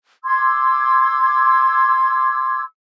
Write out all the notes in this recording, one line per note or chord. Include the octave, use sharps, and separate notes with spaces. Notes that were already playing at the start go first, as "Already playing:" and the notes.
C6 D6 E6 G#6